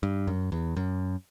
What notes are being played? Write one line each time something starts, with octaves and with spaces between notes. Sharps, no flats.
G2
F#2
E2
F#2